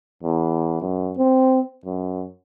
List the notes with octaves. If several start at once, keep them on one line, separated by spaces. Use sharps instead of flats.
E2
F#2
C4
F#2